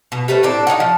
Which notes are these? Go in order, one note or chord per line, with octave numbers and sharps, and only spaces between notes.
B2
G3 A3 B4 C5
A2 C4 D4
D4 D#4 C#5 F#5
F3